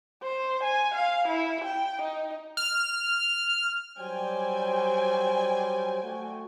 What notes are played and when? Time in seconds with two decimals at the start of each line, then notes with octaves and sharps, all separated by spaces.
0.23 C5
0.64 G#5
0.95 F5
1.28 E4
1.65 G5
2.03 D#4
2.57 F6
3.98 F#3 G3 C5 D5 G5 G#5
6.03 A3 F#4